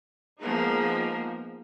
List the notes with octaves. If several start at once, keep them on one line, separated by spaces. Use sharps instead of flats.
F3 G#3 A#3 B3 D#4 A#4